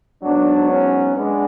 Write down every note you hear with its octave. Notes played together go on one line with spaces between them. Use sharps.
G#2 F#3 B3 D4
C#4
G#3 B3 D4